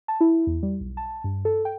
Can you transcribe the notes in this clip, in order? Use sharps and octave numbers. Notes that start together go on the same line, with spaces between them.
A5
E4
E2
G3
B1
A5
G2
A4
G5